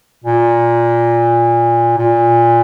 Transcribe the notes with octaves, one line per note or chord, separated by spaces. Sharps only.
A#2
A#2